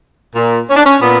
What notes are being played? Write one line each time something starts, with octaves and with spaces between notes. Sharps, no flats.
A#2
C#4
D4
C#4
A#2 B3